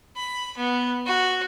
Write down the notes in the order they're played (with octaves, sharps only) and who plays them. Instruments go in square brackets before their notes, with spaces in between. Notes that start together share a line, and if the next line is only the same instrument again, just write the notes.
[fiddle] B5
B3
F#4